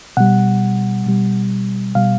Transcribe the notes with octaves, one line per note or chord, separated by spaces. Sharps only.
B2 G3 F#5
B2 G3
B2 G3 F5